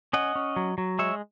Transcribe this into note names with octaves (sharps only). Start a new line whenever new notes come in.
C#4 D#5 F#5
C#4
F#3
F#3
G#3 C#5 E5